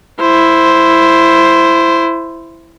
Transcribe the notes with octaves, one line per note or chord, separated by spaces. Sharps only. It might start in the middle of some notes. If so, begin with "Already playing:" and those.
E4 C5